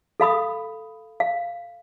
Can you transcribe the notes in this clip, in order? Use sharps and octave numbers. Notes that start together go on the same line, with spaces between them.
A4 F5 B5 D#6
F5